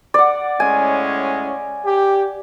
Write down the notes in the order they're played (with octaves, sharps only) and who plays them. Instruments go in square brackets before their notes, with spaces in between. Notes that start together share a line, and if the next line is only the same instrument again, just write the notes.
[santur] D5 F#5
[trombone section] A2 G#3 C#4 [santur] G#5
[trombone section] G4